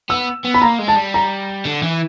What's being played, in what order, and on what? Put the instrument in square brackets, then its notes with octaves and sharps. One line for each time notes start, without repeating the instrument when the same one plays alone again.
[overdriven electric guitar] B3 [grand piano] E6
[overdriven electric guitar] B3
[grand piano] B5
[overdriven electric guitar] A#3 [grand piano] A#5
[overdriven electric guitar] G#3
[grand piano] A5
[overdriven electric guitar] G3
[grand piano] A#5
[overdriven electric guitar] D3
E3